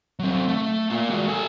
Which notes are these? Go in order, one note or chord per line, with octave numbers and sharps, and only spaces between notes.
F#3 C4
A3
A#3 F4
G#3 F#4
A4 G#5